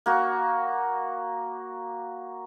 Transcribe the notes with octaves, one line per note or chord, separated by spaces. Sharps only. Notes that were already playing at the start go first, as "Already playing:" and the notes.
A#3 F#4